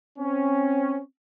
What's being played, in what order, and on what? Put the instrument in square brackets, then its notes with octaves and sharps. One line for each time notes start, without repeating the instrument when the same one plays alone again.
[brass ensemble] C4 C#4